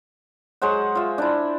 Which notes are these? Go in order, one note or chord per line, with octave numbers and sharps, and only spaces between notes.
F#3 G#3 C5 F#5
F4 E5
D4 E4